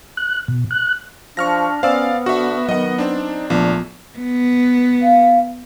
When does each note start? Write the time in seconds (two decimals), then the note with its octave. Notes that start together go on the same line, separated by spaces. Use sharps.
0.17 F#6
0.48 B2
0.71 F#6
1.37 F3 D4 C#6 F6 A#6
1.83 B3 C#4 C5 D5 F5 E6
2.26 D3 F#4 E5 C#6
2.69 D#3 F#3 D#5 F#5
2.98 C4 D4 D#4
3.50 A#1 F3 A3 B3 D4 F4
4.18 B3
5.02 F5